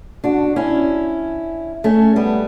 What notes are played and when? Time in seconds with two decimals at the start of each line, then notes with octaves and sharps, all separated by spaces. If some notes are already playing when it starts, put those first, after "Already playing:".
0.24 D4 F#4
0.56 C#4 E4
1.84 A3 C#4
2.16 G3 B3